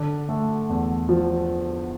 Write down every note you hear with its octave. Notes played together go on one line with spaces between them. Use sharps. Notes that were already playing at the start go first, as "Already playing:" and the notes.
Already playing: D3
A3
E2
F3